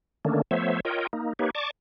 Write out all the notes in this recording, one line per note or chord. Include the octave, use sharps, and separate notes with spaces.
D3 D#3 A3 A#3 C#4 D4
F3 A3 B3 C5 C#5 E5
F4 A#4 C#5 D#5 G5
A#3 D#4
A#3 D#4 G4 B4 C#5
D5 A5 C#6 D6